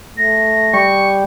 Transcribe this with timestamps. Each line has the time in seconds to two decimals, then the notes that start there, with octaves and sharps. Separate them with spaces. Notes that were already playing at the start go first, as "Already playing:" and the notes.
0.18 A3 A#6
0.73 G3 C#6